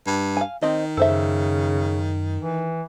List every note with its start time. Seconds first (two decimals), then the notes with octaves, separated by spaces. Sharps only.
0.07 G2
0.37 F5 G#5
0.62 D#3 C4 D#5
0.97 F#2 C#3 A4 C5 E5
2.42 E3